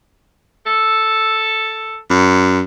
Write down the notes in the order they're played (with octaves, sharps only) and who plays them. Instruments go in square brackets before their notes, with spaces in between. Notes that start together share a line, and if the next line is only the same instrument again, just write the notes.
[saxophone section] A4
[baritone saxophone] F#2